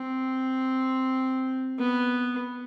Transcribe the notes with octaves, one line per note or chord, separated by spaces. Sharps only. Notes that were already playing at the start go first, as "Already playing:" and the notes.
Already playing: C4
B3